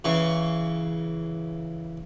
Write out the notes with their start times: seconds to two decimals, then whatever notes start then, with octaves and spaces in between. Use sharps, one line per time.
0.04 C#3 E3 C#6